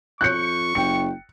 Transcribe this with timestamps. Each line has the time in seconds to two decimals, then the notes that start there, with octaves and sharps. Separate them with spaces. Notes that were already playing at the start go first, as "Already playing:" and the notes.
0.21 F2 C#6 F#6 G6 C#7
0.75 F#1 G4 G5 C#7